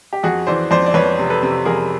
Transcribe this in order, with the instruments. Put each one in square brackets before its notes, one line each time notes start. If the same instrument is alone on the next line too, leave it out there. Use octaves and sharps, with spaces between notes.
[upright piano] G4
F2 F#4 G#4
E3 C5 D5
F2 C5 D5
D5
F2 B4 C#5
C3
A4 B4
C3
F2 G#4 A#4